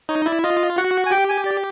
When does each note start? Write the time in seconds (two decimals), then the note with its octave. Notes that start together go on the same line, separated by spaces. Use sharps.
0.09 D#4 C#5
0.26 E4 D5
0.43 F4 D#5
0.78 F#4 F#5
1.06 G#5
1.11 G4 G5
1.29 G#5
1.46 D5